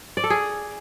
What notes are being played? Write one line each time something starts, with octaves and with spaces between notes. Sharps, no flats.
D5
A4
G#4